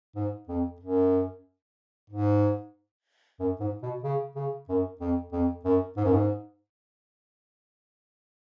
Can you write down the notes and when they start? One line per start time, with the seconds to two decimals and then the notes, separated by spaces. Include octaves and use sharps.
0.15 G#2
0.48 F2
0.80 F#2
2.10 G#2
3.40 F#2
3.60 G#2
3.83 B2
4.03 C#3
4.35 C#3
4.69 F#2
5.01 F2
5.32 F2
5.65 F#2
5.97 G#2
6.04 F#2
6.12 G#2